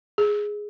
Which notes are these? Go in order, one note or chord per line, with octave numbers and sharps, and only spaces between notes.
G#4